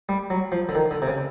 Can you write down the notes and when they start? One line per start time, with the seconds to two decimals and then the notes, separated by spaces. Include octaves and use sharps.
0.09 G3
0.30 F#3
0.52 F3
0.69 D3
0.75 D#3
0.91 D3
1.02 C3
1.08 C#3